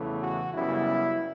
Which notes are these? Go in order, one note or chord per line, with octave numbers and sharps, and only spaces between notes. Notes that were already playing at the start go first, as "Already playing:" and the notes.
Already playing: E2 C#3 E3 A3
F#4
F#2 C#3 G3 B3 E4